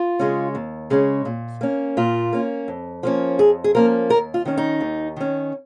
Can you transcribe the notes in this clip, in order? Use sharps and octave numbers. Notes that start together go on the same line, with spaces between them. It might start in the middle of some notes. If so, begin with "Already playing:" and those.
Already playing: F4
C#3 G#3 C#4
D#2
C#3 G#3 C#4
A#2
A#3 C#4
A#2 F4
A#3 C#4
F2
F3 A#3 C#4
F2 G#4
G#4
F3 A#3 C#4 A#4
D#2 A#4
F4
D#3 C#4
D#4
D#2
D#3 C#4